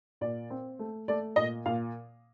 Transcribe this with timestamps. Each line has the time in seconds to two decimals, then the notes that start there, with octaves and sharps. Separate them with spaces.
0.21 A#2 D5
0.50 C4
0.79 A3
1.08 A3 D5
1.36 A#2 D#5
1.66 A#2 F5